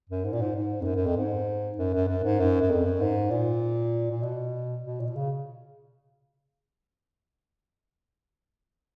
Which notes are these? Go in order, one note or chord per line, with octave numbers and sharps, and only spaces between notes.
F#2
G#2
A#2
G#2
G#2
F2
F#2
F#2
F2
G#2
F#2
F#2
F#2
G#2
F#2
F#2
F2
F#2
G#2
A#2
A#2
B2
B2
A#2
B2
C#3